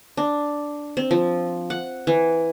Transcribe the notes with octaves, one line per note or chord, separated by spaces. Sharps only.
D4
C4
F3
F#5
E3